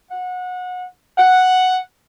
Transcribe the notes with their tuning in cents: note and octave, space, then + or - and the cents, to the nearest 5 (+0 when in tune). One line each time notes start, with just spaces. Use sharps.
F#5 -25
F#5 +0